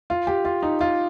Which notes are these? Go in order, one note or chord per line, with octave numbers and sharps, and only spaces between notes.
F4
G4
F4
D#4
F4